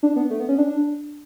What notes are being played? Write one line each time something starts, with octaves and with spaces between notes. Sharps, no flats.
D4
B3
A3
B3
C#4
D4